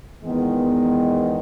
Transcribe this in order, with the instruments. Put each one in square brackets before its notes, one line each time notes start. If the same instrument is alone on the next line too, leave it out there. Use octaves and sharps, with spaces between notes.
[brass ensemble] E2 D#3 G#3 B3